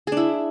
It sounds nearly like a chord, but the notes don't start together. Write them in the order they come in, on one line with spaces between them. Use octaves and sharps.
G#4 D4 E4